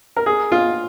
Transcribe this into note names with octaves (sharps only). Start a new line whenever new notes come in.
A#4
G#4
F4